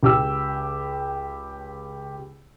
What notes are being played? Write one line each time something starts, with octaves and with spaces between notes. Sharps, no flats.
C#2 G4 E6